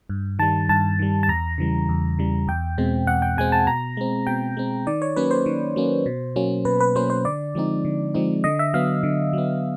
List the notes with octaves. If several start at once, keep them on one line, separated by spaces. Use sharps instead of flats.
G2
D#3 G3 A5
G2 A5
D#3 G3
A5
E2 A#5
C#3 E3 G3
E2
C#3 E3 G3
E2 G5
B2 G#3 C4
E2 F#5
G5
B2 G#3 C4 G#5
A5
B2 A#5
G#3 C4
B2 G5
G#3 C4
D#3 D5
C#5
F#3 A#3 C#4 B4
C5
D#3
F#3 A#3 C#4
B2
F#3 A#3 C#4
B2 B4
B4
F#3 A#3 C#4 C5
C5
D3 D5
F3 G#3 C4 D#4
D3
F3 G#3 C4 D#4
D3 D#5
E5
F#3 B3 F5
D3
F#3 B3